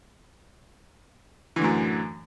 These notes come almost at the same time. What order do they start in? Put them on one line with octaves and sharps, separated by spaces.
E3 D3 A2 F#2